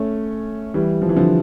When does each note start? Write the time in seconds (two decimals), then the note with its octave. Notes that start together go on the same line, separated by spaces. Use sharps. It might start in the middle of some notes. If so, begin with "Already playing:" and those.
Already playing: A3 C#4
0.74 E3 G3
1.02 F3
1.09 E3
1.16 D3 F3